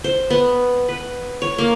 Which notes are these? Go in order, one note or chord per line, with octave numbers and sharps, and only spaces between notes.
C5
B3
B4
C#5
A#3